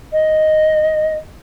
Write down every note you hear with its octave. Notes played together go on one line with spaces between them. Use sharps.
D#5